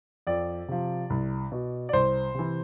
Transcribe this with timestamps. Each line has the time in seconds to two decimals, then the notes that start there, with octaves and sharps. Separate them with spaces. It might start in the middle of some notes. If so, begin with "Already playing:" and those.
0.27 F2 D5
0.68 C3 F3
1.10 C2
1.52 B2
1.89 D5
1.93 C2 C5
2.34 C3 E3